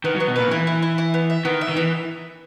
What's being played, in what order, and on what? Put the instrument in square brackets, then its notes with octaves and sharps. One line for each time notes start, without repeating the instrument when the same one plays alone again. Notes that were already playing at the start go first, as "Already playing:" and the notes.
[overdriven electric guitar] D#3 [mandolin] B3
[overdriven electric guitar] F#3 [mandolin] B3
[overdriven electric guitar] B2
[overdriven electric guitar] A#2 [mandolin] B4
[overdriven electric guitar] D#3
[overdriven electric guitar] E3 [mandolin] E4
[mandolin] E4
E4
E4
B3
E5
[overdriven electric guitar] D#3 [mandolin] B3
[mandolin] E5
[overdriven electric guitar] D#3
[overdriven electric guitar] E3 [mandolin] B3